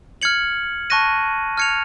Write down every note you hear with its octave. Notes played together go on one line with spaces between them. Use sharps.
F6 G#6 C#7 F#7
A5 C#6 F#6 A#6 D#7
F6 G#6 C#7 F7